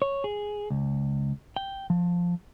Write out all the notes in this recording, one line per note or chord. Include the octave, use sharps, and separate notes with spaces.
C#5
G#4
C#2
G5
F3